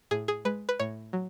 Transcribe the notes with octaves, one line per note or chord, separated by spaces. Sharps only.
A2 G#4
G#4
G#3 B4
B4
A2 C#5
F#3